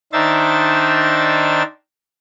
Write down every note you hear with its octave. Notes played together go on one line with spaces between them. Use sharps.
D#3 D4 D#4 C5 E5 A6